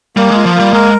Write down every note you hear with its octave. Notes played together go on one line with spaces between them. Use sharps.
G3 A#3
G#3
F4
F3
G3 A#3
G#3 A#4